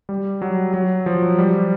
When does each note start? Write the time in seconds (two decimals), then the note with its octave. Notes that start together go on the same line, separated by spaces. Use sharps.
0.09 G3
0.42 F#3
0.74 F#3
1.06 F3
1.23 F#3
1.38 G3